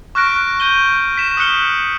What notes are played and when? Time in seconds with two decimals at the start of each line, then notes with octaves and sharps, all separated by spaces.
0.15 C#6 F6 F#6 A#6 D7
0.60 G6 D#7 G7
1.17 B6 E7
1.37 D#6 F6 F#6 C#7 G7